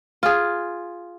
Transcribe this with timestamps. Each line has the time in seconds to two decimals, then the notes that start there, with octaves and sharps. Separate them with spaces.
0.23 F4 G#4